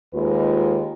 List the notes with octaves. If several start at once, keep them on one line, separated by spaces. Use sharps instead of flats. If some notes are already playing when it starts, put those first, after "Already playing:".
D#2 G#3 F4 B4